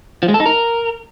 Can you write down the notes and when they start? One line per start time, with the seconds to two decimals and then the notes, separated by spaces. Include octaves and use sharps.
0.23 F3
0.28 G#3
0.34 A4
0.40 D#4
0.46 A#4